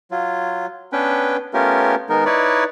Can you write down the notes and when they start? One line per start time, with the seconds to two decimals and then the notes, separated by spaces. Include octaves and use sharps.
0.11 F#3 F4
0.92 B3 C#4 D4 B4 G5
1.54 A3 B3 C#4 F4 G4 A#4
2.09 D#3 G#3 B3 D#4 A#4
2.25 D#4 E4 B4 C#5 D5